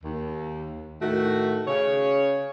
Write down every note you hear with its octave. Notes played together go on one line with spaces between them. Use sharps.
D#2
A2 D#3 A3 F#4
C#3 C#5